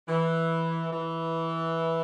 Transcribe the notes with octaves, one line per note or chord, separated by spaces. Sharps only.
E3
E3